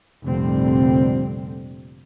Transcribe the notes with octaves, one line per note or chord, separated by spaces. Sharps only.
F1 A#2 D3 G3 C4